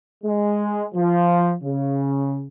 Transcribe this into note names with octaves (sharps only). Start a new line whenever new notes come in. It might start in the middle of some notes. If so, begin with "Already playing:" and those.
G#3
F3
C#3